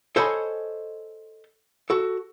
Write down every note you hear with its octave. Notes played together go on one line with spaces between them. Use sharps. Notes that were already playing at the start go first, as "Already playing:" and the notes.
A4 C5 C#5 D#5 G#5 B5
F#4 A4